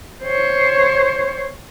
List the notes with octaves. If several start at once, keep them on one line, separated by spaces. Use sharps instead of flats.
C5 C#5